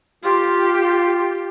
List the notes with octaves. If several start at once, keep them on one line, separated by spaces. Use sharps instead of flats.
F4 G4